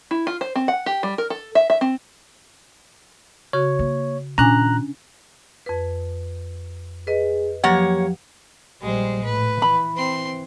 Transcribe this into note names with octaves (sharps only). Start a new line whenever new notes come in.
E4
F4
C5
C4
F#5
G4
G3
A#4
A4
E5
E5
C4
C#3 F#4 C#5
A#3
A#2 D#3 C#4 D4 G#5 A#5 F#6
F2 B4
G#4 B4 D#5
F3 F#3 A#3 G4 C#5 F#5
A#1 G3 G#3 C5
A2 B4
E3 B5
C4 C6